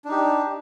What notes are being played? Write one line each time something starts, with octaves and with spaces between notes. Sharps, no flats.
D4 D#4 G4